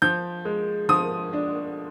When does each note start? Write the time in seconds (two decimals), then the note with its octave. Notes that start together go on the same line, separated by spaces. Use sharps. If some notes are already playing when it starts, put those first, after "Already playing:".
0.02 F3 G6
0.45 G#3
0.89 F3 D#6
1.33 D4